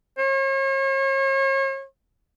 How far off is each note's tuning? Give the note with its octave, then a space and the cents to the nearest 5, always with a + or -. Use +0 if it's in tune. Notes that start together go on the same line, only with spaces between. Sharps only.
C#5 -40